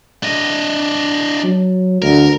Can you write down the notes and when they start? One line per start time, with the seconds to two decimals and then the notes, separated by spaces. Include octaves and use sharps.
0.23 D4 D#5
1.44 F#3
2.02 D2 A#4